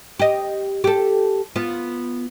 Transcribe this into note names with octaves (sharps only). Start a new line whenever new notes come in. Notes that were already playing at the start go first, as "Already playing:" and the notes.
G4 D#5
G4 A4
B3 F4